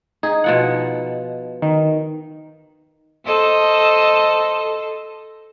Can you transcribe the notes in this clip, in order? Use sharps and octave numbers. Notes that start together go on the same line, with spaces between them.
D#4 G#4
B2 F3 F#5
D#3
A4 C5 D#5